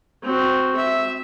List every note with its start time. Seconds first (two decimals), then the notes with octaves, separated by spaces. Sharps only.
0.23 C4 F#4
0.76 E5